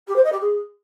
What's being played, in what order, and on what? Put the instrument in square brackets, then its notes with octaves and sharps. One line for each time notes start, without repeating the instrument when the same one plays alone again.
[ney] G4
C5
D#5
G4
G#4